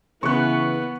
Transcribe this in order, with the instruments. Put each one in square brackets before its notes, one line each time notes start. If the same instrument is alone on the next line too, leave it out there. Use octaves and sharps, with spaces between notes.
[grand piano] C#3 C#4 [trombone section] E3 E4 [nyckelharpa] B3 [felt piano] C#6 F#6